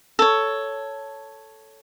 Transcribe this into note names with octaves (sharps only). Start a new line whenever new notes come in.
A4 C#5